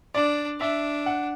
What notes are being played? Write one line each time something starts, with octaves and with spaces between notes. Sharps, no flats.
D4 D5
D4 E5
F#5